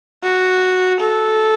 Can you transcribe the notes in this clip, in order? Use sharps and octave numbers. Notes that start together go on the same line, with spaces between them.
F#4
A4